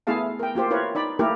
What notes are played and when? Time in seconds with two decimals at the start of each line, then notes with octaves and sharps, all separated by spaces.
0.07 A3 B3 E4 G#4 F5 A5
0.39 A#4 G5
0.55 A#3 F4 G4 C5
0.70 E4 F4 A#4 B4 C#5
0.95 D#4 D5 B5
1.19 A3 A#3 E4 G4 A4 A#4